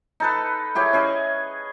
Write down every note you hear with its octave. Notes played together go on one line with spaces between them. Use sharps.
D#4 A4 B4
E4 G4 G#4 C#5
C#4 G#4 D#5